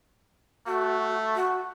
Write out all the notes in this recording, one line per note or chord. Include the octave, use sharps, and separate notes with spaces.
A3 F#4
F#4